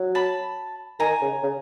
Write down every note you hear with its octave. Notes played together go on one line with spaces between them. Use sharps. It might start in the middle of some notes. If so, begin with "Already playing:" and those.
Already playing: F#3
A5 B5
D#3 G#5 A#5
C#3
C#3